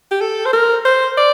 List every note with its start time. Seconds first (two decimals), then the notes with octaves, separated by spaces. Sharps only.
0.11 G4
0.21 A4
0.46 C5
0.53 A#4
0.85 C5
1.18 D5